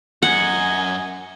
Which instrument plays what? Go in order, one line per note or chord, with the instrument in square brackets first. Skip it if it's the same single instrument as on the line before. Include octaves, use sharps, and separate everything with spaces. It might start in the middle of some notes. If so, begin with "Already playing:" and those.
[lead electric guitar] F#2 [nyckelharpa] D#5 G#5 [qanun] F#5